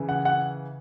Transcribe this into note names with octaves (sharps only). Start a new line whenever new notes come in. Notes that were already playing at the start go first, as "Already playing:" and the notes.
Already playing: C#3 E3
F#5
F#5